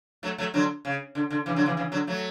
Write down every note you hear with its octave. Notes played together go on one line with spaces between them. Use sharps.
F#3 A3
F#3 A3
D3 F#3
C#3
D3
D3
C#3 E3
D3 F#3
C#3 E3
C#3 E3
D3 F#3
F#3 A3